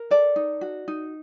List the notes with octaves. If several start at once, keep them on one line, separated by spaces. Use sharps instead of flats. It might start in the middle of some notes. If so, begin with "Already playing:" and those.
Already playing: A#4
A4 D5
D#4
F#4
D#4